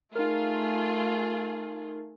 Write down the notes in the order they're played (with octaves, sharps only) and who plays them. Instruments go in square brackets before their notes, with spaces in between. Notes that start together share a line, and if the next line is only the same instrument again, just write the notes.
[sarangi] A3 [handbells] D#4 A#4 [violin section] F4 G#4